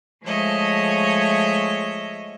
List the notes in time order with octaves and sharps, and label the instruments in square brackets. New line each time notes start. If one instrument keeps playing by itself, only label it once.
[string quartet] F3 G#3 A3 C#5 D#5 E5